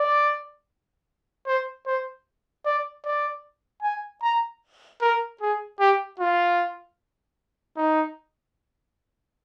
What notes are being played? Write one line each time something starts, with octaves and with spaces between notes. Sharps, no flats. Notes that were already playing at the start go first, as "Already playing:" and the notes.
Already playing: D5
C5
C5
D5
D5
G#5
A#5
A#4
G#4
G4
F4
D#4